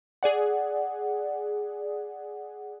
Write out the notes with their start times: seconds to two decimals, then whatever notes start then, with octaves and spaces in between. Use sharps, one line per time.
0.23 G#4 D5 F#5